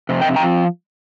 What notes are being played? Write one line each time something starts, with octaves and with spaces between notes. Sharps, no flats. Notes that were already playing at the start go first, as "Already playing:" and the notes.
F2 C3
D#5 G5
F3 C4 G5 A#5